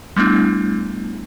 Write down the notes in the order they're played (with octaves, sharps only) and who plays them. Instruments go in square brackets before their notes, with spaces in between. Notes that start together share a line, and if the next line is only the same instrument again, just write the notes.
[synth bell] G3 A3 B3 D4 E4